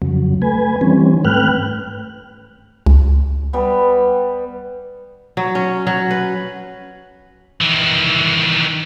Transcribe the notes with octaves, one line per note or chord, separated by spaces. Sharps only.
F2 C#3 F#3
A3 B4 G#5
D#3 E3 G3 C4 C#4
G#2 A3 B4 G5 F6 F#6
C#2
G3 B3
F#3
C#4
F#3
B4
D#3 E3